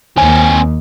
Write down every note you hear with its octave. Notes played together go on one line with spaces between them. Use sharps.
D#2 C4 C#5 G#5